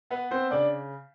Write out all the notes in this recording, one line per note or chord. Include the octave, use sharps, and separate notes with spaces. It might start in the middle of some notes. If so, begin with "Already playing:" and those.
B3 B4
C4 C5
C#3 D4 D5